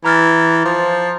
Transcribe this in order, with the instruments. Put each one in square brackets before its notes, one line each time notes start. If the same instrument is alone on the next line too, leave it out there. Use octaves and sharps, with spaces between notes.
[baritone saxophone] E3 [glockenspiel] A#5 F6 A6
[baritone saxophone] F3